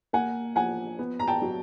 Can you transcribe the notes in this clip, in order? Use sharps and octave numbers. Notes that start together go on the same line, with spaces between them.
A#3 F#5 G#5
F3 F#5 G#5
B3
A#5
G5 A5
F#3